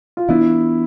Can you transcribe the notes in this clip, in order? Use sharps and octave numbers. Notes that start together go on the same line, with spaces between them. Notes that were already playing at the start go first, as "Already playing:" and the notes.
F4
E3 B3 D4 E4